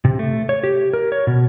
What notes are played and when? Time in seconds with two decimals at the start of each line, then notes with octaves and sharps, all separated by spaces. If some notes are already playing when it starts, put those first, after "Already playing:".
0.05 C3
0.19 A3
0.49 C#5
0.64 G4
0.94 A#4
1.12 C#5
1.27 B2